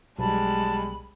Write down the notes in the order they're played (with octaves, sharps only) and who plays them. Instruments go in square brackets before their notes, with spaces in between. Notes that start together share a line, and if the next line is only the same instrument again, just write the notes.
[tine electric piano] B1 [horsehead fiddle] G3 G#3 [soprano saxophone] A5 [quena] B5